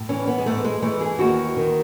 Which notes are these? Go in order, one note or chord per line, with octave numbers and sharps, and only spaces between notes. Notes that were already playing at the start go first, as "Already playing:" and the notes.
Already playing: A2
E3 C#4
B3
G#3
G#2 A3
G#3
E3 A3
G#4
D#2 F#4
D#3